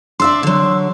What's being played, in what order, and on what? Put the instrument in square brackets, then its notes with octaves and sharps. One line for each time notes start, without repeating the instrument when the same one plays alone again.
[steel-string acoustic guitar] D4 D5 E5 [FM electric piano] C6 E6
[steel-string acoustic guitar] D3 F#3